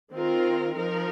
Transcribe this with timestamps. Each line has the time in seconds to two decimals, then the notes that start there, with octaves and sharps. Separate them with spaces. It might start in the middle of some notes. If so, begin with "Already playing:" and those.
0.13 D#3 C4 F4 A#4
0.77 F3 D#4 A#4